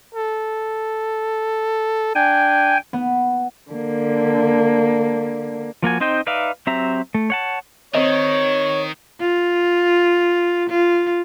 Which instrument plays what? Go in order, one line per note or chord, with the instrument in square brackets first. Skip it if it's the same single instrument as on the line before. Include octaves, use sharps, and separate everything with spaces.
[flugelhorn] A4
[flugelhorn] D4 [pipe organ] G5 G#5
[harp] B3
[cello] D3 A#3
[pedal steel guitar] F3 A#3 F#4 G#5
C4 D#4 C5 D#5 G5
D#4 B4 D5 E5 F5
F#3 C4 G4 E5 A#5
A3
C#5 F#5 A5
[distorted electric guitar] D#3 [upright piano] C4 D#5 [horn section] C#5
[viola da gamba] F4
F4